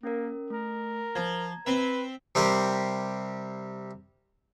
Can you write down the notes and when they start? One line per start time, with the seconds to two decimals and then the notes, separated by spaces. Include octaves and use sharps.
0.03 A#3 C#4 A#4
0.50 A3 A#4
1.16 F3 A#5 G#6
1.66 C4 B4 E5
2.35 C3 G3 C4 G4 A#4